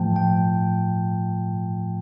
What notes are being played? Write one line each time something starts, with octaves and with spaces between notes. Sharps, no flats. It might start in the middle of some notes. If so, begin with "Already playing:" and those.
Already playing: A2 F3 A3 G5 A5
G5